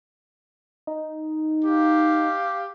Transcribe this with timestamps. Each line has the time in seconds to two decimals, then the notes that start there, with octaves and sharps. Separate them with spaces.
0.87 D#4
1.65 G4 F5